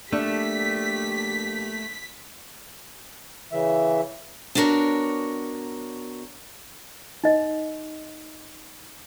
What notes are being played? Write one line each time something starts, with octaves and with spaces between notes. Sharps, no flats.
A#1 A3 A#3 D4 G4 B6
C#3 E3 E5
B3 D4 F#4 A#4 C#5 D5
D#4 D#5